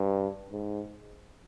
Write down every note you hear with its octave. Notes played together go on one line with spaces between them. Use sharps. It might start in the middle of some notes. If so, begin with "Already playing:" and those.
Already playing: G2
G#2